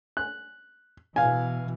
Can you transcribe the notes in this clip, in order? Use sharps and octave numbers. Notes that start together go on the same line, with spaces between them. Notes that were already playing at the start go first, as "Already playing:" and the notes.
F#6
B2 E3 F5 G#5